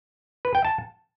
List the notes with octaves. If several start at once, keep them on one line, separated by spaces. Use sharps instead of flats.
B4
G5
A5